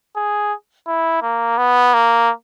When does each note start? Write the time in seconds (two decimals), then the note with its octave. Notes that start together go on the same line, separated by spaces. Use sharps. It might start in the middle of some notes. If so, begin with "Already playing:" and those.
0.16 G#4
0.87 E4
1.22 A#3
1.58 B3
1.94 A#3